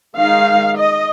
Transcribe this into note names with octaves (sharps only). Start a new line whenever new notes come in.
D#3 G#3 D#4 F5
D#5